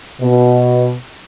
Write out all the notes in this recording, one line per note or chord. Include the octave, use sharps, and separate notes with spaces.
B2